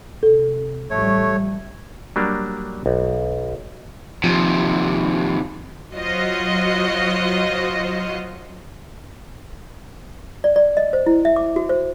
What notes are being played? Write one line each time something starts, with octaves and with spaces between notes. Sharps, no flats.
C3 A4
A1 F3 G3 A3 C#5
F#3 G3 A#3 D4
B1
D#2 C3 F3
F#3 F4 F#4 C5 D#5
D5
D5
D#5
C5
E4
E5
D6
F#4
C5